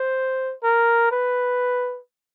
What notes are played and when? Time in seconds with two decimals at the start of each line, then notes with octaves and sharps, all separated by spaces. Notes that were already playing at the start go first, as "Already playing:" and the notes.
Already playing: C5
0.63 A#4
1.11 B4